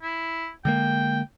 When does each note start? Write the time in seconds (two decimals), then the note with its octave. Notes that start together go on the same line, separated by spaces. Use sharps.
0.02 E4
0.65 D3 G#3 A#3 G5